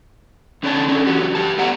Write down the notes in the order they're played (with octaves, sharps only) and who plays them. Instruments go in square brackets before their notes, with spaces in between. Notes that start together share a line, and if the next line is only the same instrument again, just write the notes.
[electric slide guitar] F2 D3 C#4 C#5 D5 A5
C#4 D4 A4
E3 F#4 G4
G2 G4 A5
A3 B3 D5 F#5 A#5